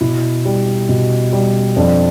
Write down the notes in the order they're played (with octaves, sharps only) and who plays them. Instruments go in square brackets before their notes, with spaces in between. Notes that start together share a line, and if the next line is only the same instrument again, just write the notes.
[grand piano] B2 E4
G3
B2
G3
F2 D4